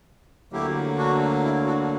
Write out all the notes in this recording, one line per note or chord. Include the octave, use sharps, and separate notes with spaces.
D2 D3 F#3 A#3 E4 G4
D4 F#4
E4
D4 F#4